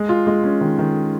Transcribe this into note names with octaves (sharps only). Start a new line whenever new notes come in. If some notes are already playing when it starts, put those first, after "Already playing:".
Already playing: G#3
F4
G#3
C#4
D#3
D#3